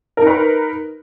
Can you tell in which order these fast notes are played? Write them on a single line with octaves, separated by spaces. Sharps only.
A#4 D#4 B4